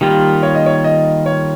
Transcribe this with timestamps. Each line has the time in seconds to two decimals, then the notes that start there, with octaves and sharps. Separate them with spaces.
0.01 D#3 G3 A#3 F4 G4
0.43 C#5
0.55 D#5
0.66 C#5
0.84 D#5
1.26 C#5